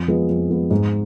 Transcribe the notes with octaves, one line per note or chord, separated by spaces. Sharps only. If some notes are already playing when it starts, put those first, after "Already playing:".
Already playing: F2
F3 G#3 B3
F2
F3 G#3 B3
G#2